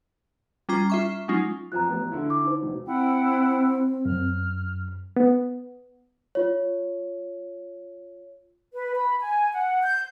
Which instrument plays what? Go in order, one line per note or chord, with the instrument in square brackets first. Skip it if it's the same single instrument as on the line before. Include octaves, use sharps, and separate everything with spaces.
[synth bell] G3 C#4 F4 A#5 D6
F4 E5 C#6
F#3 G#3 C#4 D#4 F4
[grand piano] F2 F3 F4 [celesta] A#5 F#6
[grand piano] A1 B3
D3 E4
[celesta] D6
D#4 C5
[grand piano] E1
[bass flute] C4 [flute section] E4 F#5 G5
[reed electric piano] F#2 [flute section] F6
[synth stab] B3
[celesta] F4 C#5
[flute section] B4
B5
G#5
F#5
G6